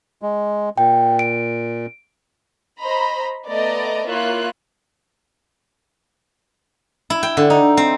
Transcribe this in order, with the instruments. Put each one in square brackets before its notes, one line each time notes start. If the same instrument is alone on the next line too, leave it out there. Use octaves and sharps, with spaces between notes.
[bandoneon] G#3
[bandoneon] A#2 [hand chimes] G5
[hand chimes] D7
[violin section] C5 D#5 A#5 B5
A3 B3 D5 D#5 A#5
A#3 E4 F4 C#5 E5 F#6
[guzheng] E4
G5
D3
D#4
C4